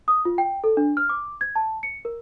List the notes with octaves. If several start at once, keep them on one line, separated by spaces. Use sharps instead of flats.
D#6
F4
G5
A4
D4
F6
D6
G#6
A5
C#7
A#4